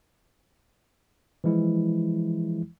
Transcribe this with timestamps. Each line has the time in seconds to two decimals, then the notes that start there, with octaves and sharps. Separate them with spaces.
1.44 E3 F3 G#3 E4